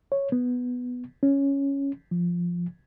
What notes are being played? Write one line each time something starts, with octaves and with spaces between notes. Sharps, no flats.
C#5
B3
C#4
F3